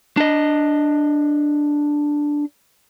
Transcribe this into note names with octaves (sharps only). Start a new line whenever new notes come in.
D4 D#5